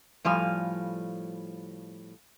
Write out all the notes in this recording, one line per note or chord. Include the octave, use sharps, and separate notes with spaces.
A2 F3 G3 F5 G#5